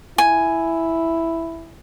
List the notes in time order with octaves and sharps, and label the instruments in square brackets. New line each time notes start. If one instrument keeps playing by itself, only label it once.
[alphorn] E4 [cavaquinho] G#5